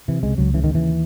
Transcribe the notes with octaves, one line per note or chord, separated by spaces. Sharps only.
C3 E3
C#2 G#3
C#2 F#3
C#3 E3
D#3
D#2
E3